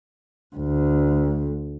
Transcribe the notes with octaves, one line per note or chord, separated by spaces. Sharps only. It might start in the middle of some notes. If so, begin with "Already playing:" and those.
D2